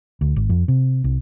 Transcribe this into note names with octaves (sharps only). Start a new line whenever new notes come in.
D2
G#1
F2
C3
C2